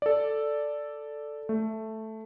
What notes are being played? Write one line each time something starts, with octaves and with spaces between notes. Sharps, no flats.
A4 D5
A3